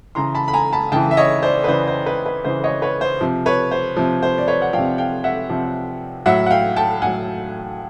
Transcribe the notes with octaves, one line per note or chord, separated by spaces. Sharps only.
C#3 E3 A#5 C6
A5 B5
B5
G#5 A#5
A5 B5
C#3 E3 G5 A5
E5
C#5 D#5
C5 D5
B4
C#3 E3 C5
C5
B4
B4
C#3 E3 C5
C#5 D#5
B4 C#5
C5
C3 F3
B4 C#5
C5
C3 F3
C5
D5
B4 C#5
F#5
C3 F3 F5 G5
F5 G5
E5 F#5
C3 F3
A2 F#3 E5 F#5
F#5
F5 G5
G5 A5
A2 F#3 F#5 G#5